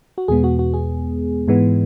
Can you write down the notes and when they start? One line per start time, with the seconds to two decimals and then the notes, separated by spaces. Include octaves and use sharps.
0.18 F#4
0.28 E2 B2 G#3 B3 G#4
0.44 F#4
0.59 F#4
0.74 G#4
1.48 G#2 E3 G#3 B3